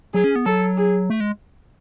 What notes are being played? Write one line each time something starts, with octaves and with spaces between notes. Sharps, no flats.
F#3 G#4
C#4
B3
F#3 A4
G#4
A3
G#3